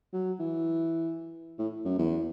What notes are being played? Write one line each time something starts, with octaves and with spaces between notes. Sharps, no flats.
F#3
E3
A2
F#2
E2